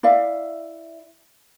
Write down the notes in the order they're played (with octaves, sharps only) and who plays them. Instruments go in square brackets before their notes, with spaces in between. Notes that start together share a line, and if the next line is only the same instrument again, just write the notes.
[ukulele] E4 D5 E5 F5